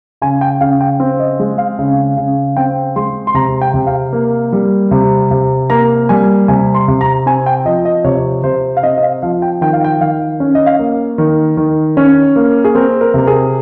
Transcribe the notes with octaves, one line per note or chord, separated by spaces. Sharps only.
C#3 G#5
G5
C#3 F5
G5
C4
D#5
G#3
F5
C#3
C#3
C4 G5
G#3 C6
C6
C3 A#5
G5
C3
F5
A#3
G3
C3
C3
A#3 A#5
G3 G#5
C3 G#5
C6
C3
A#5
C4 G#5
G5
F3 D#5
D#5
C3 C#5
C3 C5
F5
C4 D#5
D#5
F5
F3 F5
G5
D#3 G5
F5
G5
D#3 F5
C#4
D#5
F5
A#3
D#3
D#3
C#4
A#3
G#4
C4 A#4
A#4
C3 A#4
G#4